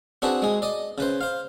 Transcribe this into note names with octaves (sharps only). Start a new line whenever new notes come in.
C4 D4 F#4 G#4 B4
G#3 G#4
D5 D#5
C#3 B4 C5
C5 F5